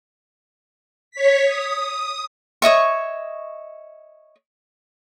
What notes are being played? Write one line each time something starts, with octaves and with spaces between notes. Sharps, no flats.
C#5 B6
D#6
C#5 D#5 E5 C#6